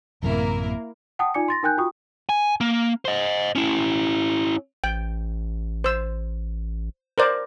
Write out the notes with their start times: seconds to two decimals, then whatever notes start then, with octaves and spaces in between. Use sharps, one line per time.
0.23 A1 F#2 C3 A#3 E4 A#4
1.19 F#5 G5 A5 D#6
1.34 D#4 F4 D5 G#5 D6 C#7
1.48 C6 A6 A#6
1.63 D#4 A#4 G5 G#5 F#6 G6
1.78 F4 F#4 G5 C#6 D#6
2.29 G#5
2.61 A#3
3.05 C5 D#5
3.56 C#4 E4
4.84 A1 G5
5.84 C5 E6
7.18 A#4 C5 D5